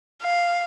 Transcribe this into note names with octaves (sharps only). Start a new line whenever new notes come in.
F5